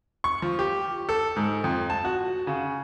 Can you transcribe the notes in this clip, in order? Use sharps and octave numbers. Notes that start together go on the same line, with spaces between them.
C#6
F3
G4
A4
G#2
F2
A5
F#4
C#3